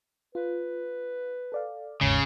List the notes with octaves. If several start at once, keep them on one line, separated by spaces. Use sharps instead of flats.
F4 B4
A4 D5 F5
G1 D#2 G#2 C#3 C#5